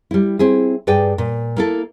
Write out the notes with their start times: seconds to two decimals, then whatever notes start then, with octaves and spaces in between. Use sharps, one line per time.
0.11 G3 E4
0.39 C4 E4 G#4
0.87 G2 G#4 B4 D5 G5
1.18 A#2
1.57 A#3 E4 A4